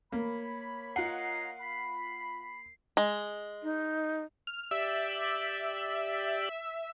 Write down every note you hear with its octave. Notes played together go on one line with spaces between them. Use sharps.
A#3 C#5 B5
F4 C#5 D#5 F#5 A#5 C7
B5
G#3
D#4
F6
G4 D5 E5